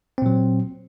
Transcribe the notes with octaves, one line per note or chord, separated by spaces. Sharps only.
A#2 F#3 C4